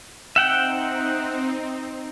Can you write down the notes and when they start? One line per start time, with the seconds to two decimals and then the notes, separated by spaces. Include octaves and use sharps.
0.36 C4 D#4 E5 F#5 G5